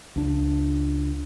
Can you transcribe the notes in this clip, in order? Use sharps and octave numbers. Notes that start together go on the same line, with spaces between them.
C#2 D4